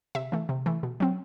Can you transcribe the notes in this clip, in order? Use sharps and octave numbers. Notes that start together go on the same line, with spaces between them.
C3 E5
E3 A3
C3
E3 A3
B2
F#3 C4